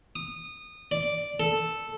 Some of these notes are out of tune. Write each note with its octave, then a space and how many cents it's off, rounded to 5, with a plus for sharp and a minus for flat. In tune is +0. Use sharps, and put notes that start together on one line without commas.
D#6 -20
D5 -5
A4 -5